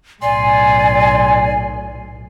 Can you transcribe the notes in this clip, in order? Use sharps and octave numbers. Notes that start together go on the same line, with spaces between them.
B1 A2 D5 G#5 C6